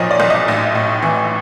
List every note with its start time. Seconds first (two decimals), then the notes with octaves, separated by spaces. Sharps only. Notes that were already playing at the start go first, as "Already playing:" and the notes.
Already playing: B1 A#2 F3 C#5 D#5
0.11 D5
0.20 B1
0.30 D#5
0.48 A1
0.75 A2
1.02 E3